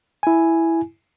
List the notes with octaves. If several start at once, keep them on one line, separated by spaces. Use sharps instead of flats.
E4 G#5